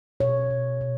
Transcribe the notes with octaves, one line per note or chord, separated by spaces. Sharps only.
B2 C#5
B2
B2